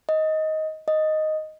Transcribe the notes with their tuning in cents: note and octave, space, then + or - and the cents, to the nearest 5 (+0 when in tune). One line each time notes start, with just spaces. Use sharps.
D#5 +15
D#5 +0